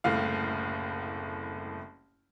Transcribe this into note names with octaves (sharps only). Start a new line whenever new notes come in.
F#1 C2 A2 F5